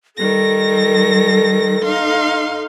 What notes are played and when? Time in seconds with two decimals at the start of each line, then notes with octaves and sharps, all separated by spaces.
0.16 D#3 G3 A4 A#6
1.83 D#4 F5 C6